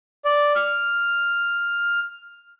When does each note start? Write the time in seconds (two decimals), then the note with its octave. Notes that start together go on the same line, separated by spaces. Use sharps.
0.25 D5
0.55 F6